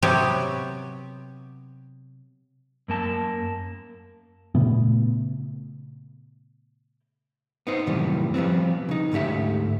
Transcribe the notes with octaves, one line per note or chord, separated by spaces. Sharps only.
C3 F#3 B3 G4 C#5
F#2 A#3 A5
A#2 C#3 A3 B3
B3 D#4 C5
F#2 A2 C3 D#3 E3 G3
F3 G3 B3 C4
C#3 D#4
D2 G#2 A3 G4 E5